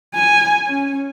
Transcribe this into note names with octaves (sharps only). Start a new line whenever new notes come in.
G#5
C#4